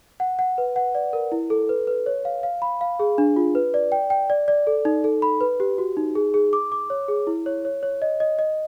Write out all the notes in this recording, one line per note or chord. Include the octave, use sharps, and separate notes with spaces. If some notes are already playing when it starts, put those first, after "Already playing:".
F#5
F#5
B4
F#5
D5
A#4
E4
A4
B4
B4
C#5
F5
F5
B5
F5
G#4
D4
F4
B4
D5
G5
G5
D5
D5
A4
D#4
A4
B5
B4
G4
F#4
D#4
G#4
G#4
D6
D6
C#5
G#4
E4
C#5
C#5
C#5
D#5
D#5
D#5